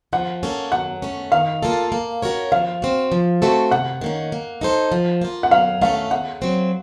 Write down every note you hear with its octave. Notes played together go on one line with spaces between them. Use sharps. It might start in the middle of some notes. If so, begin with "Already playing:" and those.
F3 F#5
A#3 C#4 A4
F#3 F#5
A3 C#4
D#3 F5
A#3 F4 A4
A#3
C#4 F#4 A#4 C#5
F3 F5
C4 F#4
F3
A3 C4 F#4 A4
C3 F#5
D#3 A#3 C#4
A#3
D#4 A4 C5
F3
A#3 F4
F#5
F#3 F5
A3 C#4 A4 F5
C#3 F#5
F#3 C4